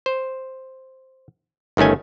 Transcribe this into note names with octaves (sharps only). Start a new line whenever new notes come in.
C5
G1 D#3 A3 C#4 G#5